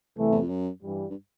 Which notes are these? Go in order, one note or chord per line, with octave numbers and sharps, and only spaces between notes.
C2 C3 E3 A3
E2
F2
F#2
G2 E3 G3
G2